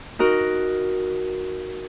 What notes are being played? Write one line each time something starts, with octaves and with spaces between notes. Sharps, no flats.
D#4 F#4 A#4